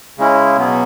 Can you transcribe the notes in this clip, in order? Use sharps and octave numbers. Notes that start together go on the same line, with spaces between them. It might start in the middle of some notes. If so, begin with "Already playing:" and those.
C#3 G#3 C#4 E4
B2 F#3 B3